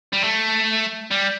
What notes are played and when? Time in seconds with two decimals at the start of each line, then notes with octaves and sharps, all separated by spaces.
0.13 G3
0.23 A3
1.11 G3